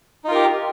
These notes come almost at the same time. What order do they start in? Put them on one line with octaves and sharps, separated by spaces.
D#4 F4 A#4 G4